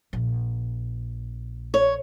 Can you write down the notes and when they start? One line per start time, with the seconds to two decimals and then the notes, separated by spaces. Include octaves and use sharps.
0.13 A#1
1.74 C#5